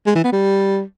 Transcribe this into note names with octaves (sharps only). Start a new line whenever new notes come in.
G#3
E3
B3
G3